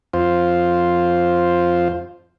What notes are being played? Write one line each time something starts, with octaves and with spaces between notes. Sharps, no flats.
F2 F4 C5